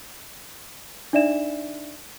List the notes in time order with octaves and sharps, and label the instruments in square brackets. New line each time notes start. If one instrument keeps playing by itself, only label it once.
[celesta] D4 D#4 D5 E5 E7